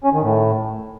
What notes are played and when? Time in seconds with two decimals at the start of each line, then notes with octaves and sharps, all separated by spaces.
0.04 C#4
0.13 D#3
0.22 A2